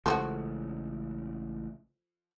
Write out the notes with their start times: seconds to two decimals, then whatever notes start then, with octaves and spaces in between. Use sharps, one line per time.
0.06 A1 C#3 F3 G#3 E4 F#4 G4 A4